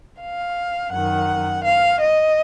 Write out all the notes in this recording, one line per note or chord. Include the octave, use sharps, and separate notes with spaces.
F5
F#2 D#3 F#5
F5
D#5